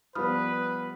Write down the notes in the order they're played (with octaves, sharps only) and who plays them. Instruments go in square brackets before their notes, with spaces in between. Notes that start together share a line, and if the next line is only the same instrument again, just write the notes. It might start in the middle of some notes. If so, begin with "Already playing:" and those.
[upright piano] F3 G3 B3 [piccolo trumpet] B4 [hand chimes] B5 D#6 F6